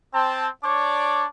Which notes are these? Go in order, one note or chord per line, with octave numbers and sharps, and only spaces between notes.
C4 A5
D4 C#5 D5 D6